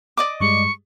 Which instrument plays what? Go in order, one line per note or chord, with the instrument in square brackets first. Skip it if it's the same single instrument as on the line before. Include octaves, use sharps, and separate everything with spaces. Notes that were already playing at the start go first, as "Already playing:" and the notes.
[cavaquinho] D5 D#5 D6
[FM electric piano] G2 G3 G#3 [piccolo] C#6